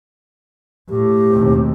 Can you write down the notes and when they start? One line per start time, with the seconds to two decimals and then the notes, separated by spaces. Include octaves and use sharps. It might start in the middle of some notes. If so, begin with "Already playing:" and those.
0.89 A2 G4
1.31 D#2 B2 C4